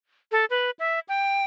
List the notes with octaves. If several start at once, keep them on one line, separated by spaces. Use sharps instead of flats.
A4
B4
E5
G5